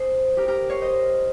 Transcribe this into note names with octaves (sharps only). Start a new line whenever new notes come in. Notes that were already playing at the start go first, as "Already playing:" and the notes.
Already playing: G#4 C5
G4 A#4
G4 A#4
C#5 F5
C5 D#5